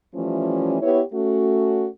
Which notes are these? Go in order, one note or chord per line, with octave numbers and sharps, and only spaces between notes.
E3 F3 G3 A3 C#4
B3 E4 G4 B4 C#5
A3 C#4 F#4